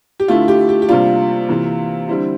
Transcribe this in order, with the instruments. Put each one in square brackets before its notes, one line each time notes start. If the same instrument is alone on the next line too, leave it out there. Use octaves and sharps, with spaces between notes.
[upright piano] G4
D3 A3 E4 F4
G4
G4
G4
C3 G3 A#3 D4 F4
C3 E3 A#3
D3 G3 C4 E4